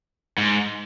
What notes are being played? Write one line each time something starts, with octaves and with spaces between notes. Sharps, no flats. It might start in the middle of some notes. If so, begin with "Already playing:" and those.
G#2